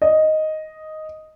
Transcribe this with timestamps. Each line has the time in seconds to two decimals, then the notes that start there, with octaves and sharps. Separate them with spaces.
0.02 D#5